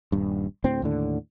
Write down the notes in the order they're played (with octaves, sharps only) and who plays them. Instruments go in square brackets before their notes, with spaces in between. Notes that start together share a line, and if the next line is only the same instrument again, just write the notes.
[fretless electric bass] D#1 G2
D2 A2 C4
D#2 A2 D3